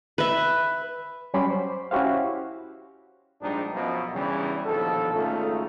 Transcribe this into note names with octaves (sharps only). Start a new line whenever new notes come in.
B4 E5
F#3 G3 C#4 B5 C6 D6
C5
C#4 E4 F#4 G4 C5 F5
A#1 G#2 G3 G#3 D4 D#4
F#2 B2 F3
E2 G2 C#3 E3 G3
A#1 D#2 B2 F3 A4
G#1 C#3 A3 D#4 F4 A4